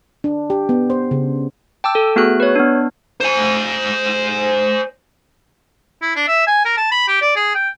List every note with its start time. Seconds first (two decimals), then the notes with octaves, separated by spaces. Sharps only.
0.24 D4
0.50 G4
0.69 B3
0.90 C5
1.11 C#3
1.84 G5 A5 D6 E6
1.95 A4
2.16 A3 B3 F#4 G#4 F#6
2.40 B4 C#5
2.56 B3 D4
3.21 C5 G#5
6.02 E4
6.16 D4
6.28 E5
6.47 G#5
6.65 A#4
6.77 A5
6.91 B5
7.08 G4
7.21 D5
7.36 G#4
7.55 G5